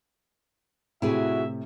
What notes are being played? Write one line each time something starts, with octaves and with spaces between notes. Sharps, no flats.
A2 C3 E4 F#4 G#4 B4 E5